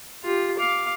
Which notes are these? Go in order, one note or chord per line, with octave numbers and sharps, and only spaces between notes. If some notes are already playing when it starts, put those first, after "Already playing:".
F4 G4
F5 D6